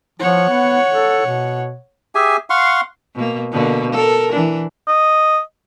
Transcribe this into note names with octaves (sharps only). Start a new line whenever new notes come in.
F3 C#5 F#5
B3
A4
B2
G4 G#4 E5 G#5
F5 F#5 C6 C#6
B2 A#3
B2 D3 A#3
A4 A#4
E3 D4
D#5